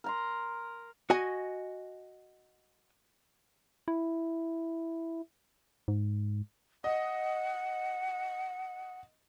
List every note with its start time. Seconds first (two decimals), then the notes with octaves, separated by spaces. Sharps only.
0.04 A#4 A#5 C6
1.10 F#4 D#5 G#5
3.88 E4
5.88 G#2
6.84 D#5 F#5